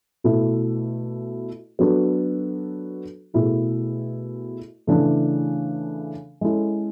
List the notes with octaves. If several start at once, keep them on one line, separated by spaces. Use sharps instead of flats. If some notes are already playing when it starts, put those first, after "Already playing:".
B2 A3 E4
F#3 B3 D4 F#4 A4
B2 A3 E4 G#4
C#3 E3 A3 D4
G#3 C#4 E4 A4